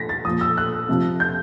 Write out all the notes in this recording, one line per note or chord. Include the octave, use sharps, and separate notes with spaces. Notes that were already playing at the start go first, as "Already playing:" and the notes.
Already playing: A#2 F3 A#6 B6
A6
A#2 F3 D#6
E6
F#6
C3 F3
G6